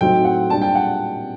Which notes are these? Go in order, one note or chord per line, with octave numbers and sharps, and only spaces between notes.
A2 F#3 C4 D#4 G5
F#5
A#2 G3 D4 A5
G5
F#5